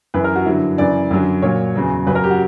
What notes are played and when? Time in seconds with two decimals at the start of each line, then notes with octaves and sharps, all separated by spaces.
0.14 F#2 E3 B4
0.24 A#4
0.36 F#4
0.46 G2 D3 F#3 E4
0.78 F#2 C#3 E3 D5
1.11 F#2 D3 F#3
1.42 A#2 F#3 C#5
1.76 E2 C#3 F#3
2.07 F#2 C#3 F#3 B4
2.15 A#4
2.24 G4
2.31 F#4